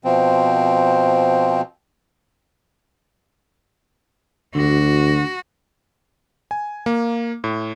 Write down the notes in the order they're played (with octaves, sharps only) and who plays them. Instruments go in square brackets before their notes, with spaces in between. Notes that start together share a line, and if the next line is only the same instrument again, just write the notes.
[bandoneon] B2 F3 C4
[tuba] D2 [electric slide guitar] D3 [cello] F#4
[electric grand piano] G#5
A#3
A2